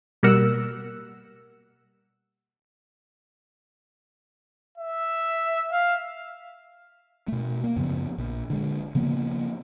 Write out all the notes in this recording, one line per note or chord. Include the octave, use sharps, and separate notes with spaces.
B2 G3 A#3 A#4 F#5 E6
E5
F5
B2 A3
A#3
F#2 C#3 F3 B3
A#1
D3 G#3
C#3 F3 A#3 B3